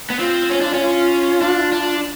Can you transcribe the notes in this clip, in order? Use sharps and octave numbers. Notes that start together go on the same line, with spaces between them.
B3
C4 F4
C#4
D4
C#4
F4
D4
D4